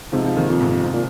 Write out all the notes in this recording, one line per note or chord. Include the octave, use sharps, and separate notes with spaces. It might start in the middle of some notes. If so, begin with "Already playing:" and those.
G#2 C3 F3
F3
A#2 D#3
F2
G#2 C3
G#2 C3
A#2